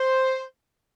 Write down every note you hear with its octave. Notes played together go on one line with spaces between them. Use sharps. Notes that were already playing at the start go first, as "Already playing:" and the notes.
Already playing: C5